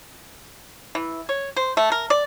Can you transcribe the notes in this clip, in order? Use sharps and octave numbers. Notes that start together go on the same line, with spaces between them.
E3
C#5
C5
A3
A#4
D5